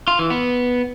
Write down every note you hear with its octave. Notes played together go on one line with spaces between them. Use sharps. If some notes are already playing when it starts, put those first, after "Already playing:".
F4
E3
B3